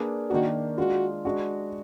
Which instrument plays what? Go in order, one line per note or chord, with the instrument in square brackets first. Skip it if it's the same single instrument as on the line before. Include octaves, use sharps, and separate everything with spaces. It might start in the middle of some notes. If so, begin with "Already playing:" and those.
Already playing: [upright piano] A#3 D4 G#4 B4 D5
[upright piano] D#3 A#3 D4 [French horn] F#4
[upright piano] G#3 D4 F4 [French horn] F#4
[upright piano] G#3 D4 F#4